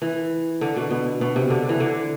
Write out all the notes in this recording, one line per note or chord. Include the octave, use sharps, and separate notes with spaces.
E3
D3
B2
B2
B2
C3
D3
E3
D3